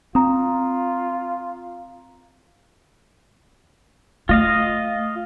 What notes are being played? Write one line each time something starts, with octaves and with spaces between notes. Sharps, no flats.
C4 F4 A#5 D#6
A3 F4 D#5 F5